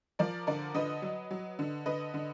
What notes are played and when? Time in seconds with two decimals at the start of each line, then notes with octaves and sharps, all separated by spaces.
0.19 F3 A#4 D5
0.47 D3 A#4 D5
0.75 D3 B4 D#5
1.02 F#3
1.31 F#3
1.59 D3
1.86 D3 B4 D#5
2.14 D3